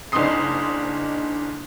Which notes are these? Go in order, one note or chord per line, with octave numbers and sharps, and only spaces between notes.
F#1 D4 D#4 C6 D#6 C7